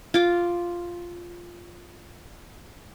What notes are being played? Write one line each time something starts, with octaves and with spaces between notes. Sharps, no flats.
F4 D6